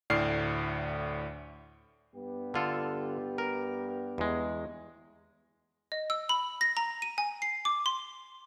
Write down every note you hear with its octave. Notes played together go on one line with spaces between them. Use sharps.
D2 A2 D5 F6 C7
G2 B3 G4
D3 F4 A4
A#4
E2 G#3
D#5
E6
B5
A#6
A#5
D#7
G#5
C7
D6
C6